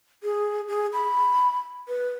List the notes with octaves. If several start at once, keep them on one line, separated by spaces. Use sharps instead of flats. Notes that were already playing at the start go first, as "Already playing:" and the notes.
G#4
G#4
B5
B4